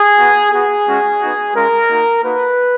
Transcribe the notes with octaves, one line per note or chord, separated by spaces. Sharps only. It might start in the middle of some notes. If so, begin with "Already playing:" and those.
Already playing: G#4
B3 F#4
B3 F#4 G#4
G#3 C#4 F#4
B3 D#4 F#4
G#3 C#4 F4 A#4
A#3 D#4 F#4
A#3 D#4 F#4 B4